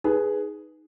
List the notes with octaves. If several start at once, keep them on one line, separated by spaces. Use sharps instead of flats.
D#4 G#4 B4